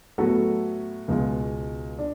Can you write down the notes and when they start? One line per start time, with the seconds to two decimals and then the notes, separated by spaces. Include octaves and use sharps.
0.18 A2 F#3 B3 F#4 A4
1.08 C#2 B2 G#3
1.99 D4